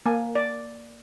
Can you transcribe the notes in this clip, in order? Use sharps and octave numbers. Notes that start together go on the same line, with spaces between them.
A#3 G#5
D5